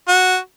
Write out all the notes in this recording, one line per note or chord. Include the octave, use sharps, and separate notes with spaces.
F#4